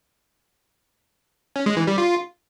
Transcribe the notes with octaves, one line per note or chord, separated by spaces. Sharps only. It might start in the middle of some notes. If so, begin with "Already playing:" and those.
C#4
G#3
E3
G3
F4